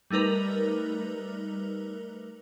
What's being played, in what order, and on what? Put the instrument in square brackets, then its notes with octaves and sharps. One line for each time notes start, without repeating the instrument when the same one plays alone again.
[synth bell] G3 A3 D#4 A#4 B4